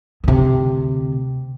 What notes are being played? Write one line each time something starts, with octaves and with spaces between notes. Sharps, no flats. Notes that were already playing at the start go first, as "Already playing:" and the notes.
D2 C3